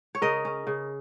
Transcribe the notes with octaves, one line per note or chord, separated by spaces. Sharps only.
C#5
C#3 A#4 D#5
C#4
C#3